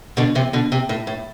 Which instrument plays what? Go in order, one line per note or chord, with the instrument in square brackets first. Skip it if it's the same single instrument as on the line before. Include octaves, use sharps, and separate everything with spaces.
[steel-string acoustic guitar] B2 D3
C3 E3
B2 D3
C3
A2
A2